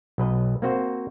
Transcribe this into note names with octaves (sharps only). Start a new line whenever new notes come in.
B1 F#3 B4 D#5
A#3 C4 F#4 C5